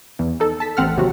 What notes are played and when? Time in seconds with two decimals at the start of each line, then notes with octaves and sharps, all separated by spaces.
0.19 E2
0.40 D#4 A4
0.60 A5 B6
0.77 A1 C4 F#5 F6
0.97 D#2 C3 F#3 F#4